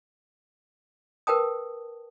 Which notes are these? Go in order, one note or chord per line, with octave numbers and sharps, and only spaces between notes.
A#4 B4 G5 A5 D#6